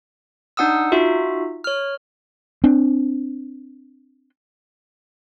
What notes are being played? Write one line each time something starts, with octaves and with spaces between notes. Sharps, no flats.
D4 D#4 F#5 D#6 E6
D#4 F4 F#4 E5
C#5 F6
C4 D4